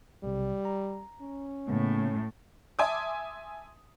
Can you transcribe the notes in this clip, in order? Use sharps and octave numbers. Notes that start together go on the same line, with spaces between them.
B1 C3 G3
A#5
C#4
A2 C#3 A#3 B3
E5 G#5 A5 C6 D6 D#6